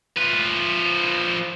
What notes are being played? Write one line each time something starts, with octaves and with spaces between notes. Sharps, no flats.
F3 B4